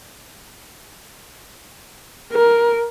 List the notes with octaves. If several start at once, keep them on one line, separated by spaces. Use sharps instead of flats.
A#4